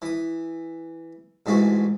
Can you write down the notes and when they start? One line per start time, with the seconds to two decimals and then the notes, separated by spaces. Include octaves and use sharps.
0.02 E3 D#6
1.46 A1 G#2 E3 F4 F#4